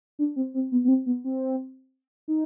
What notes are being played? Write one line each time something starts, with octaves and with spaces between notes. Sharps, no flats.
D4
C4
C4
B3
B3
C4
B3
C4
D#4